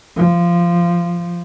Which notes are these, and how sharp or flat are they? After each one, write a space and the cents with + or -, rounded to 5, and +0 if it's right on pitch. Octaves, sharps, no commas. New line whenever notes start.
F3 -15